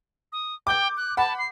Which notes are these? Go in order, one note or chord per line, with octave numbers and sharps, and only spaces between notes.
D#6
G5 D6 G6
F#6
F#5 A5 B5
C7